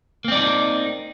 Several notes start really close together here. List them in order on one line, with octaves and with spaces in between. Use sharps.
A#3 C4 D5 D#4